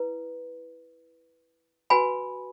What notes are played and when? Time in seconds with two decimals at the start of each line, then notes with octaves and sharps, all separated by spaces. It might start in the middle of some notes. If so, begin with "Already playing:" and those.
Already playing: E4 B4
1.90 F#4 B4 G#5 B5